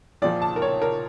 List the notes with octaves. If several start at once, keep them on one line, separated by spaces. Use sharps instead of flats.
A#1 A#2 F3 D5
A5
A#4
C#5
A#4